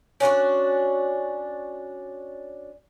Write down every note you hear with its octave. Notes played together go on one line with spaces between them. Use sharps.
C#4 D4 F4 F#4